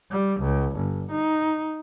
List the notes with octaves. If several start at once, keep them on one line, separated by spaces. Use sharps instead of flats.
G3
C#2
G1
D#4